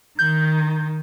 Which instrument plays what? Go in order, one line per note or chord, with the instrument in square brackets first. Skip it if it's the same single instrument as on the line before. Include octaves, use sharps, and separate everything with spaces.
[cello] D#3 [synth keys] G6